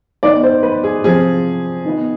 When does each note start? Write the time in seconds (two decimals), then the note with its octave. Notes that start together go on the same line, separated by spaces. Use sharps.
0.23 D#3 B3 D5
0.43 C5
0.63 B4
0.84 G#4
1.04 C3 F3 C4 G#4
1.85 D#3 B3